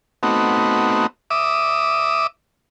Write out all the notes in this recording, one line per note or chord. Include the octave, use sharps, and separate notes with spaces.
A3 B3 C4 D#4 F#4
E5 D6 D#6